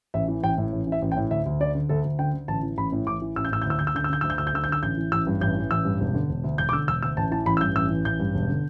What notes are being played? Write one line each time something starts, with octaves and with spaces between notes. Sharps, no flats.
A1 E5
E3
A1 G5
A2
A1
E3
E5
A1
G5
A2
D2 E5
D2
D3 D5
D3
D2 A4
D2
D3 G5
D3
A1 A5
E3
A1 B5
A2
A1 D6
E3
A1 E6
G6
A2 E6
G6
D2 E6
D2 G6
E6
D3 G6
E6
D3 G6
D2 E6
G6
D2 E6
G6
D3 E6
G6
D3 E6
A1 G6
E3
A1 E6
G2
A1 G6
E3
A1 E6
G2
E1
D3
E1
D2
E1 G6
D6
D3 E6
E1 E6
D2 E6
A1 A5
E3 A5
A1 B5
E6
G2 G6
A1 E6
E3
A1 G6
G2
E1
D3